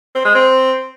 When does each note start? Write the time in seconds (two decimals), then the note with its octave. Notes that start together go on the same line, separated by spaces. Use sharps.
0.15 C4
0.25 G#3
0.35 C4